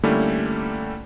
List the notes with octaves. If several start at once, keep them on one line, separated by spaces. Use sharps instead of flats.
D3 G3 A3 A#3 C#4 E4